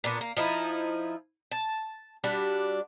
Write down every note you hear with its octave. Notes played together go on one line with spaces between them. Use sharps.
A#2 B3 D4
A#3
F3 D#4 E4
A5
G3 D4 F#4